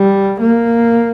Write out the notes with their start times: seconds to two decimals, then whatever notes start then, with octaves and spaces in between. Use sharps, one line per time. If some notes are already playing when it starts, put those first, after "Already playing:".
Already playing: G3
0.40 A#3